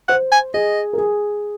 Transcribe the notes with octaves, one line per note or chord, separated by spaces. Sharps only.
C5 F#5
G#5
G#4 D#5
A#4
G#4